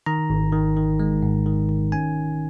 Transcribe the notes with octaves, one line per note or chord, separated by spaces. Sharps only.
D#3 A#5
G#1
D#3
D#3
G#3
G#2
D#3
D#3
C#4 G#5